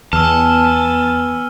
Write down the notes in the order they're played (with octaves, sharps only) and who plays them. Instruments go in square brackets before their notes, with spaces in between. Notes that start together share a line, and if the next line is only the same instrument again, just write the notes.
[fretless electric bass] E2 [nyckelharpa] B3 G#5 [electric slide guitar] A5 [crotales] E6 F6